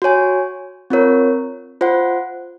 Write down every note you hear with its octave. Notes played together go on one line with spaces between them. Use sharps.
F#4 C#5 G#5
C4 F4 A#4 C#5
F4 C5 F#5